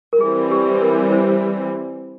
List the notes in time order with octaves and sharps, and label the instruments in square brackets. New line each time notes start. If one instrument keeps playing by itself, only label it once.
[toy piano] A#4
[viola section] E3 G3 C4 [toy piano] G#4
[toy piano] G4
A#4
C5